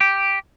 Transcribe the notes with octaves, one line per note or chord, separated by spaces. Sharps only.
G4